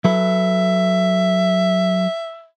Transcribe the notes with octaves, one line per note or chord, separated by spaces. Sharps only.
F#3 A4 B4 E5